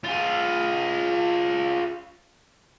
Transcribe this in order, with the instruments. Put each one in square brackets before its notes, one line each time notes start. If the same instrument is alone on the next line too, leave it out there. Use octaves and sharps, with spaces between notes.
[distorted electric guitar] F4 G#4